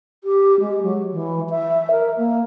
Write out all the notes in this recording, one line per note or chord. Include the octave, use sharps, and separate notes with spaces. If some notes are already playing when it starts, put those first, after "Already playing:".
G4
G#3
F#3
E3
E5
A#4
A#3